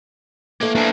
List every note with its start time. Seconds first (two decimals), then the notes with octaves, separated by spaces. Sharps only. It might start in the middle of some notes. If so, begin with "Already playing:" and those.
0.61 E3 A3 A#3
0.76 A#3 D4 B4 A#5